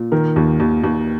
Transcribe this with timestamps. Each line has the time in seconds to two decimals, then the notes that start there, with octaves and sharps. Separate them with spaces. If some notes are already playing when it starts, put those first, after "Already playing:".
Already playing: A#2
0.12 D#3 A#4
0.36 D#2
0.60 D#2
0.83 D#2